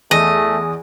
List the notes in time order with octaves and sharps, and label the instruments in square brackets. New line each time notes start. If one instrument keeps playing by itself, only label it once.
[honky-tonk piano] E2 [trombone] A3 [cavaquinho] D#5